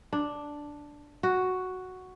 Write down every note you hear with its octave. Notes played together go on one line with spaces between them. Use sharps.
D4
F#4